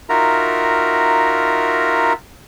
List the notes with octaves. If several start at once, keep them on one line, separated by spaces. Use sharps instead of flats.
D#4 F4 F#4 A#4 E5 A#5